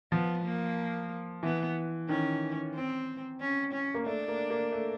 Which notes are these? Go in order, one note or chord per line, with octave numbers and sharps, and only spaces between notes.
F3 B3
A#3
E3 B3
D#3 C#4
C4
C#4
C#4
A#3
A3 D4
A#3
A#3
A3